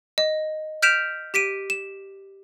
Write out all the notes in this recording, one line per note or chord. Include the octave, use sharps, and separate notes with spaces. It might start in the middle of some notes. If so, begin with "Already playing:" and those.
D#5
F6 G6 B6 D7 E7 F7
G4 B6 D7 D#7
E7